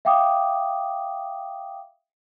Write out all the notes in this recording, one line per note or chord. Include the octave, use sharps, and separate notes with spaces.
E5 F5 G5 D6 D#6